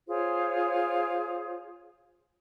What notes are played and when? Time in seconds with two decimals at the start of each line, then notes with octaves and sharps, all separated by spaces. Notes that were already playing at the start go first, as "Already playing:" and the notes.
0.08 F4 G#4 C5 C#5